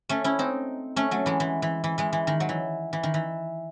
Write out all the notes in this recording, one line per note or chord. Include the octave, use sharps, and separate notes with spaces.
A3 C#4
C#4 E4
C4 D#4
A3 C#4
F#3 A3
E3 G#3
E3
E3
E3
E3 G#3
E3
D#3
F#3
E3
E3
D#3
E3